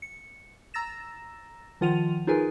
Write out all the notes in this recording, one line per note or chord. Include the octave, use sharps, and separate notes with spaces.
C#7
A#5 E6 A6 A#6 E7
D#3 F3 F4 F#5 D#7 F7
D#4 F4 G#4 A#4 B4 G#5